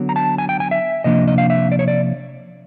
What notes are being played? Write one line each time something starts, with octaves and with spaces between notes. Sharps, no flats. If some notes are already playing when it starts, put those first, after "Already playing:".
Already playing: D3 F#3 B3
A#5
A5
G#5
G5
G#5
E5
C3 F3 A#3 D4 D#5
D#5
F5
E5
D5
C#5
D5